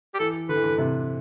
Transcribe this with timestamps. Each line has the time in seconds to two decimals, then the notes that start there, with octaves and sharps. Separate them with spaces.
0.14 G4
0.19 E3 A4
0.49 D3 B4
0.56 E3
0.64 D3
0.78 C3